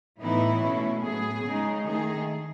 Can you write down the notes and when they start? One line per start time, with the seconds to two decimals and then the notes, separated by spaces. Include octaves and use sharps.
0.20 A2 E3 B3 D#4 E4
0.61 B2 A3 C#4
1.03 A2 F#3 B3 G#4
1.44 C#3 G#3 D#4
1.85 D#3 A3 D#4 G#4